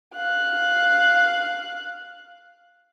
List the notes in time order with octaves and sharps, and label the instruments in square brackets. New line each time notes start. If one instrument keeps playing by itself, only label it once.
[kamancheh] F5 F#6